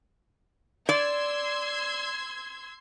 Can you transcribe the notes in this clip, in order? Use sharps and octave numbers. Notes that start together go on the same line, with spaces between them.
D5 C6 E6 G#6